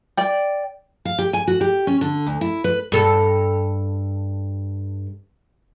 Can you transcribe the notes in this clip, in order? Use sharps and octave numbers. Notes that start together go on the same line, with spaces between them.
D5 G5
F5
G4
G#5
F#4
G4
C#4
D3
D2
E4
B4
G2 A4